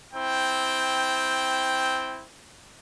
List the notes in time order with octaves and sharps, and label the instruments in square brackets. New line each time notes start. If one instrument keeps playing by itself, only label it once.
[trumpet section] C4 E4 G5